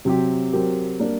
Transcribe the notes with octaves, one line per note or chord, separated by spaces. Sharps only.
C3 F#3 C4 G4
F#3 C4 G4 A#4
G3 A#3 D4